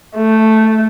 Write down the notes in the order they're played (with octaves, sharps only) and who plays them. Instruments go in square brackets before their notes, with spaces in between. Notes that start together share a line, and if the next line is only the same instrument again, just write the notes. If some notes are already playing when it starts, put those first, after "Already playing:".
[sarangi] A3